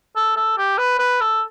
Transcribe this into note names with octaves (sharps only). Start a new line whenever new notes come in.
A4
A4
G4
B4
B4
A4